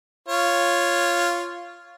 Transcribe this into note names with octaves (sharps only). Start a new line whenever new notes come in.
F4 C#5